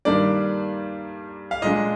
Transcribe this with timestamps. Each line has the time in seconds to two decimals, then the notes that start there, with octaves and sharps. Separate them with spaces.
0.05 G2 D#3 G3 A#3 D4 D5
1.51 F5
1.62 A#2 G#3 D4 D#5